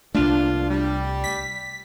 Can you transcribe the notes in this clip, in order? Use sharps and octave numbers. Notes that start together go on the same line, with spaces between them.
C2 F3 A3 A#3 D4 F4
G3
B6